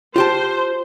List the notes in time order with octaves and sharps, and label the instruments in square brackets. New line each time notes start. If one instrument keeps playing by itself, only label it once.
[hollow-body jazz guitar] F4 G4 A5 [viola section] C5